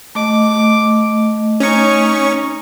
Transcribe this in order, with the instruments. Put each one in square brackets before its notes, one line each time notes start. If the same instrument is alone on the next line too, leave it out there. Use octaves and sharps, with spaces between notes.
[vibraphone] A3 D#5 [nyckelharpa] D6
[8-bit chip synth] C#4 C#6 [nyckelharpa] D#4